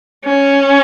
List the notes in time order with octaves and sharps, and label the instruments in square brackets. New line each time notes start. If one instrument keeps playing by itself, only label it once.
[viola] C#4